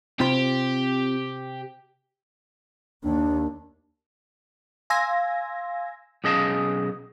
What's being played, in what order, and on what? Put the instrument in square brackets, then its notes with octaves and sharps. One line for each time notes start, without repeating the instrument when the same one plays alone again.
[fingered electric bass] C3 [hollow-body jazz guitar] C4 F4 B5 [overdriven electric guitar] G4
[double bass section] D#2 [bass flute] D4
[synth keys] F5 G#5 C6 E6 G#6 A#6
[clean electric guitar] B1 C#4 G#4 D#5 F5 A5